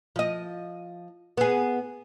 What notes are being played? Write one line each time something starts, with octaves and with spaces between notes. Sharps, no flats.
F3 D#5
B3 G#4